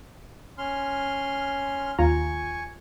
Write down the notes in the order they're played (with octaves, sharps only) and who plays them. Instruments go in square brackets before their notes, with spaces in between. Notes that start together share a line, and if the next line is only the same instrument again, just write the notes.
[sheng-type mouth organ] C#4 C6 F6
[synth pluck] D#2 F4 A#5 [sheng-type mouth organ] G#5 C#6